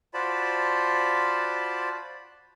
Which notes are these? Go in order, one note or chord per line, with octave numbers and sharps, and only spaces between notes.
F4 F#4 C5 D5 A5 B5